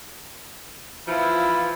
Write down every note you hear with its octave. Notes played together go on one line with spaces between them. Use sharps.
E3 F3 E4 F4